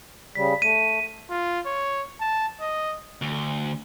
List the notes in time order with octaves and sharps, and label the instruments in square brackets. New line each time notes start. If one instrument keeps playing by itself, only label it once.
[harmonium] C#3 G3 [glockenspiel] B6
[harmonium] A3 [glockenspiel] D#7
[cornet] F4
C#5
A5
D#5
[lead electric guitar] D2